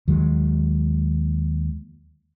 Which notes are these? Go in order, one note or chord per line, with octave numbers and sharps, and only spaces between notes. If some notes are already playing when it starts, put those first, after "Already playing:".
D#2 D#3 F#3 G#3